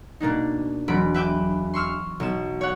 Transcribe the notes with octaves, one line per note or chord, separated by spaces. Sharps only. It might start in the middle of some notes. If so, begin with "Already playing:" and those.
B2 A#3 D4 D#4
E1 F#3 C4 B5 D7
B4 E5 G5 D6
C6 C#6 E6 F6
B1 E7
C#5 F#5